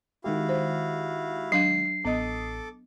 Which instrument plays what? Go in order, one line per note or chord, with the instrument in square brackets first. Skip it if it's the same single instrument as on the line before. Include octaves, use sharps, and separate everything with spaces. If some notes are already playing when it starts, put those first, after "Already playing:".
[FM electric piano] D#3 G#3 G4 [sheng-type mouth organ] E4 F#4 F5
[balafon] C5
[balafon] F#3 D4 F5 [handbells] C7
[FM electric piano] A1 D#6 [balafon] B3 D#5 [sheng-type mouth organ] A4 D6